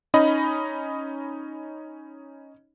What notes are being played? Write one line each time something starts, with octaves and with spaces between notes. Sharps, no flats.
C#4 D#4 D#5 B5